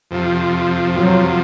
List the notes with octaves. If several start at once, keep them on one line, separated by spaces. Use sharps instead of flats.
F2 C3 F3
F#3